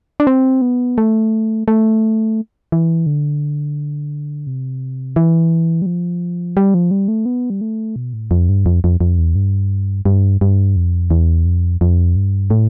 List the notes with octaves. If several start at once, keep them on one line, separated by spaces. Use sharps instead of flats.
D4
C4
B3
A3
A3
E3
D3
C3
E3
G3
F3
G3
F3
G3
A3
B3
G3
A3
B2
A2
F2
G2
F2
F2
F2
E2
G2
G2
G2
F2
E2
F2
F2
G2
A2